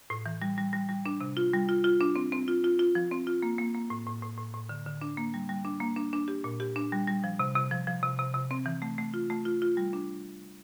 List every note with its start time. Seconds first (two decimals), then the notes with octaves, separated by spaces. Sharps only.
0.10 A2
0.26 E3
0.42 G3
0.58 G3
0.73 G3
0.89 G3
1.06 D4
1.20 C3
1.37 F4
1.53 G3
1.69 F4
1.84 F4
2.01 D4
2.16 C4
2.32 C4
2.48 F4
2.64 F4
2.79 F4
2.95 F3
3.11 C4
3.27 F4
3.43 A#3
3.58 A#3
3.75 A#3
3.90 A2
4.06 A2
4.22 A2
4.38 A2
4.54 A2
4.69 D3
4.86 D3
5.01 D4
5.17 A#3
5.34 G3
5.49 G3
5.65 D4
5.80 A#3
5.96 D4
6.13 D4
6.28 G4
6.44 A#2
6.60 G4
6.76 D4
6.92 G3
7.07 G3
7.24 F3
7.39 C3
7.55 C3
7.71 F3
7.87 F3
8.03 C3
8.19 C3
8.34 C3
8.51 C4
8.66 E3
8.82 A3
8.98 A3
9.14 F4
9.30 A3
9.45 F4
9.62 F4
9.77 G3
9.93 D4